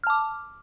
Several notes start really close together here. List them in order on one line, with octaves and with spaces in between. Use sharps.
F6 A5 D6